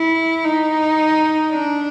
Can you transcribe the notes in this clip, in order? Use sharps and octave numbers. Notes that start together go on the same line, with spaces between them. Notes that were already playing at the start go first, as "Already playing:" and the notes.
Already playing: E4
D#4
D4